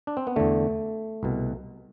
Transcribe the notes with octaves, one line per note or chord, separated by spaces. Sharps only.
D4
C4
B3
E2 D3 A3
C2 B2